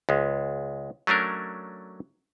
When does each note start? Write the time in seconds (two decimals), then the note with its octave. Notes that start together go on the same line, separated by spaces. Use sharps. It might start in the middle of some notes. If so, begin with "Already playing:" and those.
0.09 C#2 G#3
1.07 F#3 A3 C#4 D4 A#4